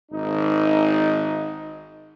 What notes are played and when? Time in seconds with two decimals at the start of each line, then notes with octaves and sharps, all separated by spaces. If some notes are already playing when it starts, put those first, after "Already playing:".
0.12 G#1 D#4